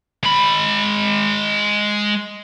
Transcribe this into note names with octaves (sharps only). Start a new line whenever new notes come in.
G#3 B5